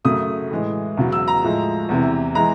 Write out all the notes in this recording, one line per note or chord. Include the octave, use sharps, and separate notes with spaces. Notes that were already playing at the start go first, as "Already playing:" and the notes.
F#2 C#3 F#3 A3 D#6
A2 E3 G#3
E2 C#3 F#3
E6
A#5
A2 F3 G#3
E2 C3 E3
E3 G#3 A#5